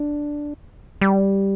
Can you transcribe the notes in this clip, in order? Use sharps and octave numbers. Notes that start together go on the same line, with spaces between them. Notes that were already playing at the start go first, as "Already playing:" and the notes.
Already playing: D4
G3